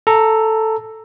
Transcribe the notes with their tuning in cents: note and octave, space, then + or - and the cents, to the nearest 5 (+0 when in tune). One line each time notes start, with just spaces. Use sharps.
A4 +0 A#5 -10